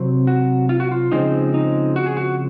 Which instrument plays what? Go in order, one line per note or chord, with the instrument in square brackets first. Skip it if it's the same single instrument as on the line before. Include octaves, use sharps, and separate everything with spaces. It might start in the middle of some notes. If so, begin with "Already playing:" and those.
Already playing: [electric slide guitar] C3 F#3 C4
F#4
F4
F#4
F4
C#3 F3 G#3 C4 D#4
D#4
F#4
G#4
F#4